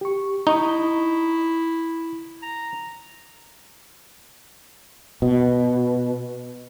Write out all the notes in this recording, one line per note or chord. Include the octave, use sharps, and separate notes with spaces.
G4 C#6
D#4 E4 A#5 C#6 D#6
A#5
B2